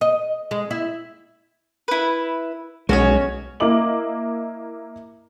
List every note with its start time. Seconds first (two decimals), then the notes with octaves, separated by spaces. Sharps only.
0.01 D#5
0.51 G#3
0.71 E4
1.88 E4 B4
2.89 B1 G#3 C#4 F#4 A4 C#5
3.60 A#3 E4 D#5 D6 F#7